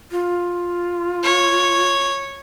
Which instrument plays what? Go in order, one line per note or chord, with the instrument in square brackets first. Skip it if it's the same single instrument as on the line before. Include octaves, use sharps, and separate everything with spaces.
[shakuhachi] F4
[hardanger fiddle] C#5